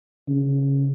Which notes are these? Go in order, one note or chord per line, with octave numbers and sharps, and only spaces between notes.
C#3